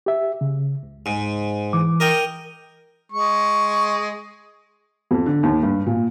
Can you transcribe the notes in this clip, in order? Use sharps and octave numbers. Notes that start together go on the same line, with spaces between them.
G4 E5
C#3
C#2
G#2
E3 D6
A#4 D#5 G5
G#3 C#6
F2
D3
D#2
G2
A#2